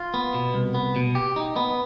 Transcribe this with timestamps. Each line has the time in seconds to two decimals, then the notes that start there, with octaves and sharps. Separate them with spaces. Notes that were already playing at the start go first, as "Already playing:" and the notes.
Already playing: F4
0.14 B3
0.34 B2
0.54 C2
0.74 B3
0.96 B2
1.15 G4
1.36 D#4
1.56 B3